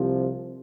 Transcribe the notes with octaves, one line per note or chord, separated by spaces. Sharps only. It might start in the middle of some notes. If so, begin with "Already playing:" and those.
Already playing: C2 C3 F3